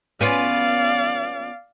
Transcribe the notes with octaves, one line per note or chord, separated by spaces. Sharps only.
B3 C#4 F4 D5 F5